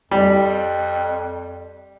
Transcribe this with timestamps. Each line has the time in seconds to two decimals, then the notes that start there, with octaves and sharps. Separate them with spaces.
0.11 F2 G3